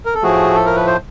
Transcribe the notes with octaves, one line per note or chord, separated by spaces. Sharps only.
A#4
A4
A2 F3 A3 F#4 G#4
A4
A#4
B4
C5